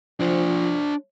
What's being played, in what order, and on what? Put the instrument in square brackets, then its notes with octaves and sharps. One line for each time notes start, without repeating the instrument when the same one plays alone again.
[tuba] F3 [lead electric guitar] D4 C5